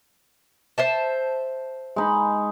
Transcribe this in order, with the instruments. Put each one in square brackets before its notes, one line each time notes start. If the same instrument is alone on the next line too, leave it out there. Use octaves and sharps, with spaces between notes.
[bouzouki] C5 E5 A5
[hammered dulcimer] G#3 D#4 B5